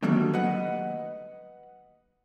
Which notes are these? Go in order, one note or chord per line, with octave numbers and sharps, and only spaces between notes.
D3 D#3 F#3 G3 A3 A#3
B4 D#5 F#5